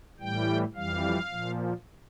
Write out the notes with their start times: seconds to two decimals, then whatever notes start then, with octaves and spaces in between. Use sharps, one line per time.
0.20 A2 E3 G3 G5
0.75 F2 E3 G3 F5
1.29 A#2 F3